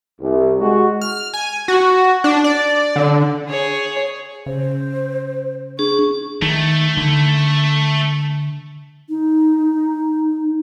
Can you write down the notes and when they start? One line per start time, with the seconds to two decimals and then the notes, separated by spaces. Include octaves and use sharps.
0.20 C2
0.61 G#3 F#4
1.01 F6
1.34 G#5
1.68 F#4
2.24 D4
2.44 D5
2.96 D3
3.49 G#4 C#5
4.46 C#3 C5
5.79 D4 G#4 C#6
6.42 D#3 A3
6.97 D3
9.09 D#4